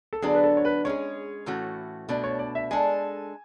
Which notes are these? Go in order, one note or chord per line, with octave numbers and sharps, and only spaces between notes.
A4
D3 F#3 B3 D4 G#4
B4
A4
C#5
B4
G#3 C#4 G#4 C#5
A2 E3 A3 C#4 F#4
B2 A3 D4 D5
C#5
D5
E5
G#3 D4 A4 G#5